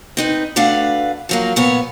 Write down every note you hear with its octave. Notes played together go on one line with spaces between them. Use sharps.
C4 D#4 B4
D2 A3 D4 B4 F5 F#5
F3 F#3 A#3
A#2 B3 C#5